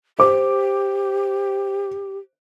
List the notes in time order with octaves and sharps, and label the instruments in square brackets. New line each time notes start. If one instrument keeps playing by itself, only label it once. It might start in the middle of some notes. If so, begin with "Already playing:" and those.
[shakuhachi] G4 [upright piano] C5 D6